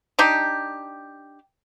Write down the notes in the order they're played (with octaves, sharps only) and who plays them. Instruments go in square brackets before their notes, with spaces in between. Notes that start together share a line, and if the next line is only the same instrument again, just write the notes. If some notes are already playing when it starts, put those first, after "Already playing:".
[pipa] D4 D#4 G4